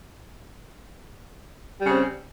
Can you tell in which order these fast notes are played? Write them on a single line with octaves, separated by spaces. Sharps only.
G3 C#3 C4